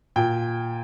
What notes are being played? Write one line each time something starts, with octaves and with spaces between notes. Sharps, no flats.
A#2 G5